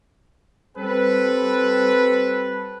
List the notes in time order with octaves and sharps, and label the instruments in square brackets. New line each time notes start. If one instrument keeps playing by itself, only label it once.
[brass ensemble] G3 C4 A4 B4